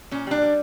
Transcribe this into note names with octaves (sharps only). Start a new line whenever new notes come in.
A#2 C#4
G3 D4
G3